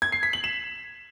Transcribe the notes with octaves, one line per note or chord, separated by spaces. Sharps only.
G#6
C7
B6
F#7
E7